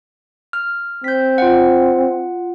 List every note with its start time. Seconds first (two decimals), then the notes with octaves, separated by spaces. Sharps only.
0.53 F6
1.04 C4 G6 B6
1.38 F4 F#5